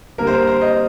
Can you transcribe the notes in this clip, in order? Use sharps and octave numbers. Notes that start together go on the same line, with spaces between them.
D3 G3 A#3 A#4
C5
A#4
C5
D#5